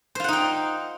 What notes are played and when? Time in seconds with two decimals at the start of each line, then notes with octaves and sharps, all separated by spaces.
0.15 C5
0.20 F4
0.24 F#5
0.28 D#4
0.33 G5